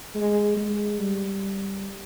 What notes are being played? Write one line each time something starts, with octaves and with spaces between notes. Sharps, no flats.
G#3
G#3
G3